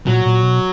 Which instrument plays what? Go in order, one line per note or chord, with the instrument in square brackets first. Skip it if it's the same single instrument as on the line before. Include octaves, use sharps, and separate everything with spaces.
[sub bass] A#2 [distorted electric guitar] F#3
[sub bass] A#2
B2